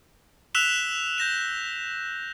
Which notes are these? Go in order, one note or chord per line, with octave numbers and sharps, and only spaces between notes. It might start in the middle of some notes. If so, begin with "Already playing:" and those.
E6 F#6 B6 E7 F7 G7
G6 A#6 E7